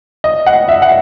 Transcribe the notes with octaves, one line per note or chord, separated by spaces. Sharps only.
D#5
F#5
E5
F#5